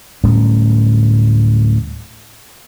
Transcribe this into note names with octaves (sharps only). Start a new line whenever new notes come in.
D1 A2 G3 C#4